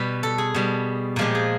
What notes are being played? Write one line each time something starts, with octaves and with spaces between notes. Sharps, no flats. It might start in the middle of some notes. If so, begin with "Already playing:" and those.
Already playing: B2 G3 B4
A4
G#4
B2 G3
A#2 F3 G#3 G4
G#4